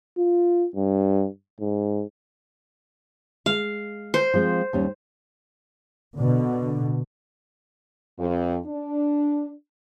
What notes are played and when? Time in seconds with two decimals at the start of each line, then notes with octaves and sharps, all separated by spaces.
0.18 F4
0.75 G2
1.60 G#2
3.46 G#3 F5
4.14 C5
4.34 F3 G#3 C4
4.73 D#2 G3 C#4
6.15 B2 D3
8.19 F2
8.67 D4